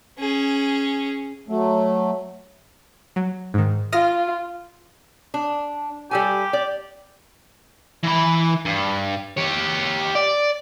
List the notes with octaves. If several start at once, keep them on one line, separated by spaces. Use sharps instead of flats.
C#4 G#4
F#3 A3
F#3
G#2 D#3
F4 D#6 F6 A#6
D4
G3 G4 A4 G#5
D5
E3 B5
G2
G4 C#5
D5